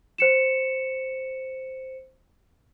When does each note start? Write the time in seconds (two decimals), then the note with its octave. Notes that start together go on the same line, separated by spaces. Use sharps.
0.18 C5 C#7 E7